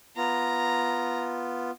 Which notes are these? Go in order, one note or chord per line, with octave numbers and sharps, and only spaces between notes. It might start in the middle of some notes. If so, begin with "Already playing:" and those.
B3 F4 A#5